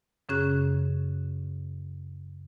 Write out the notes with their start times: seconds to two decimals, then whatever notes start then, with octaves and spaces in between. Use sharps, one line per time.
0.29 F#2 C#3 C#4 G#4 F#6